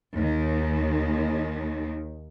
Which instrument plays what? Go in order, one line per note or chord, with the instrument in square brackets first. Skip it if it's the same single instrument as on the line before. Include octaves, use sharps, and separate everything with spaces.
[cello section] D#2 D#3